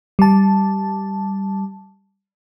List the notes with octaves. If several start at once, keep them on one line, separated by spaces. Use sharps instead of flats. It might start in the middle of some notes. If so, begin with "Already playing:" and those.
G3 A5